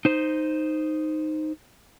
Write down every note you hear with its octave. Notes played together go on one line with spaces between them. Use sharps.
D#4 C5